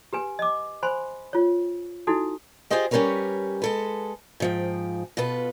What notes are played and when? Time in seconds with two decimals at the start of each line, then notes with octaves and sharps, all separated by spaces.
0.13 G4 B4 G#5
0.39 D#5 D6
0.83 C5 G#5 B5 C6
1.33 F4 C#5
2.07 D#4 E4 F#4 A4
2.70 F4 G4 G#4 C5 D#5 G5
2.91 G3 C#4 G4 A#4 B4 C#5
3.62 G#3 A4 B4
4.40 G#2 F3 G5
5.17 B2 F4 A4 B4